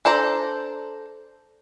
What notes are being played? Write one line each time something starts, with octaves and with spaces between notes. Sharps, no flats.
D4 A4 C5 D5 A#5